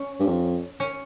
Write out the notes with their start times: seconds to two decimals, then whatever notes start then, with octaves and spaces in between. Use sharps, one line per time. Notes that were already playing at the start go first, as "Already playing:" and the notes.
Already playing: C#4
0.20 G2
0.27 F2
0.80 C#4